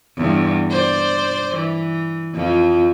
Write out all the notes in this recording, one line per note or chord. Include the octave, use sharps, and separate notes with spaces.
E2 G2
C5 D5
E3
F2 F3